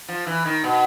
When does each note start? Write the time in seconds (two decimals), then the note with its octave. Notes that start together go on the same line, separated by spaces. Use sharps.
0.08 F3
0.27 E3
0.45 D#3
0.64 B2